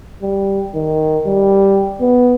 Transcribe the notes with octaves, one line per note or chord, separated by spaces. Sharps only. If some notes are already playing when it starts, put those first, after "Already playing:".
G3
D#3
G3
B3